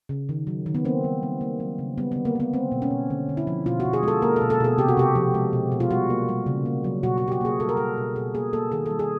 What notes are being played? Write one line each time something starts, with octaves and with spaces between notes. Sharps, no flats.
C#3
D#3
F#3
D#3
B3
A#3 C4
G3
G3
A#3
F#3
C#3
G3 B3
B3
D3
A#3
A#3 B3
G#3 C4
B2
C#4
B2
D3
D3
E4
F3
B2 F4
F#4
B2
G#4
G#3 A4
A#3 A#4
A4
B2
A4
B2 G#4
C3 G4
F#4
C3 G4
F3
G#3
B2
B2
F4
G3 F#4
A#3
G3
C#3
A#3
F#3
B2 F#4
F#4
B2
G4
F#4
A#3 G#4
G3 A4
A#4
G3 A4
B2
B2 G#4
A#3 G#4
A#3 A4
D#3 G#4
A4
G3
G#4